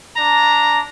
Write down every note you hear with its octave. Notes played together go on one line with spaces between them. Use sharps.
D4 A#5